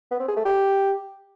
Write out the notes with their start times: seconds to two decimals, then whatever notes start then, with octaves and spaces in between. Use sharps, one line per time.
0.11 B3
0.20 C4
0.28 G#4
0.37 A3
0.45 G4